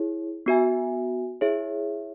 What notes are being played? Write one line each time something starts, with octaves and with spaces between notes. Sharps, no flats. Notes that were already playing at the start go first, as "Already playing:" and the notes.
Already playing: E4 G#4 C#5
B3 F#4 E5 G#5
E4 G#4 C#5 E5